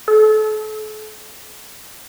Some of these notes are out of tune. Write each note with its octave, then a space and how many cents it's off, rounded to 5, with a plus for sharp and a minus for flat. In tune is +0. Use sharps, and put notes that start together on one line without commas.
A4 -40